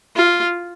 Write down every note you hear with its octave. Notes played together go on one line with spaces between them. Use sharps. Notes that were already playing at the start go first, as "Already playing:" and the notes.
F4